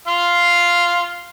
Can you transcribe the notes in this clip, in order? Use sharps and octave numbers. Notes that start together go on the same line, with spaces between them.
F4 F5